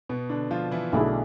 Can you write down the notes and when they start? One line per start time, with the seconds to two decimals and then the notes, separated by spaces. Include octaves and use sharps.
0.09 B2 B3
0.29 D3 D4
0.51 F3 F4
0.72 E3 E4
0.92 B1 B2 D3 A3 D4 E4 G#4